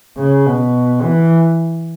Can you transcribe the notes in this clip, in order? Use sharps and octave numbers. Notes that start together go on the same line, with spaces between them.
C#3
B2
E3